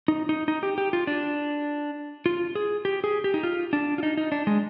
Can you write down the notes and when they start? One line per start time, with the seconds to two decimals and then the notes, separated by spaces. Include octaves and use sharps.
0.08 D#4
0.29 D#4
0.48 D#4
0.63 G4
0.78 G4
0.93 F4
1.07 D4
2.26 F4
2.55 G#4
2.85 G4
3.04 G#4
3.24 G4
3.34 D#4
3.43 F4
3.73 D4
3.98 F4
4.03 D#4
4.17 D#4
4.32 D4
4.47 G#3